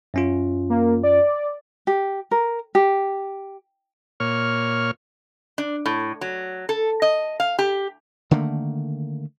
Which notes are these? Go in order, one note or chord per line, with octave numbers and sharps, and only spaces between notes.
F#2 C#4 F4
A#3
D5
G4
A#4
G4
A#2 C#5 F6
D4
A2
F#3
A4
D#5
F5
G4
D3 D#3 A3 A#3